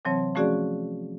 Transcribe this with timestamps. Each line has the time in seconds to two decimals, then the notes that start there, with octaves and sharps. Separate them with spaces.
0.05 C3 E3 F#3 C4 C#5 A5
0.35 F3 A3 C#4 F#4 G#4 D5